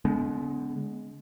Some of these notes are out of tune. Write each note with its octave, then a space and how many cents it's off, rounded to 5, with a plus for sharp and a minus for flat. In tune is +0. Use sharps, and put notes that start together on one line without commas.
D3 -35 G#3 +15 B3 +15